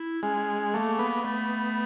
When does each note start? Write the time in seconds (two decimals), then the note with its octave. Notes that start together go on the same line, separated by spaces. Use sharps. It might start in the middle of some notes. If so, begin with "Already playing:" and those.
Already playing: E4
0.22 G#3 C#4
0.74 A3 A#3
0.99 B3
1.24 A3 B3